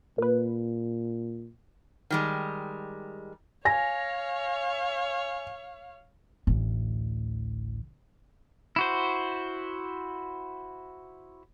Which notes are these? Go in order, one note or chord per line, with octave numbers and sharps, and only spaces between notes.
A#2 A#3 B4
D#3 G3 G#3
C#5 F5 G#5 A#6
A1 D2
E4 F#4 C5